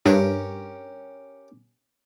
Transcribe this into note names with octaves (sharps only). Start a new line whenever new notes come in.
G2 C#4 G4 A#4